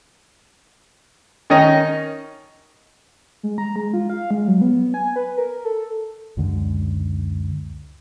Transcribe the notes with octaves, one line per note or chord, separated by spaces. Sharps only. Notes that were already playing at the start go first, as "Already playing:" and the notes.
D#3 C#4 D#4 D#5
G#3
A#5
G#3
F4
F5
G#3
F#3
B3
G#5
B4
A#4
A4
C#2 F#2 D3 G#3